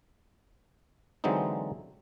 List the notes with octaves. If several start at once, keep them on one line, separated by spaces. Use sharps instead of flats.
D3 E3 F#3 G#3 C4 D#4